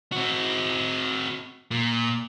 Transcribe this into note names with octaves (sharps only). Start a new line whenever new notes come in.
C4 F#4
A#2